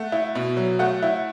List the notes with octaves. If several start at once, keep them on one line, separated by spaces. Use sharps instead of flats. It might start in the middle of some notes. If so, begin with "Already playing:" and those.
Already playing: A3 F#5
E4
B2
F#3
A3 F#5
E4